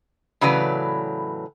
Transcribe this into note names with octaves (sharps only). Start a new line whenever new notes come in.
A2 C#3 E3 F#3 B4 D5